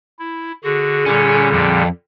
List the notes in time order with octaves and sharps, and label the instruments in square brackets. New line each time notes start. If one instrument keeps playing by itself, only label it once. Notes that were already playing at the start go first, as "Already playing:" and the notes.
[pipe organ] E4
[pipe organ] D3 F#4 [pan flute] G#4
[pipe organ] A#2 D3 G3 [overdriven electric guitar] C#4
[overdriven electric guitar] F2